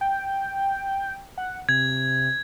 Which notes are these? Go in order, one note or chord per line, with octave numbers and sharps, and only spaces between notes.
G5
F#5
C3 G#6